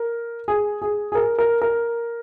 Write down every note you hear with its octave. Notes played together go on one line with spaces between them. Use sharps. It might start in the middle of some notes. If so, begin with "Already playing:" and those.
Already playing: A#4
G#4
G#4
G#4
A#4
A#4
A#4